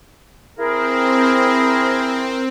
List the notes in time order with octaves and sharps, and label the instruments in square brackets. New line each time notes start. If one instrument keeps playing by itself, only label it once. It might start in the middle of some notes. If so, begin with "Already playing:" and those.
[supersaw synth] C4 [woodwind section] E4 G#4 A#4